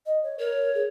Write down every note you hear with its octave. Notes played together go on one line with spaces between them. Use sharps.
D#5
C#5
A#4 C#5
G#4